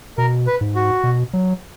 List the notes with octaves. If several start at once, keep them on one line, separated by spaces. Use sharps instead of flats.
B2 A#4
B4
G#2
F#4
B2
F#3